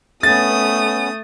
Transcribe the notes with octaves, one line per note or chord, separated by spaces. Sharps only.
A3 B3 C#4 D#6 A6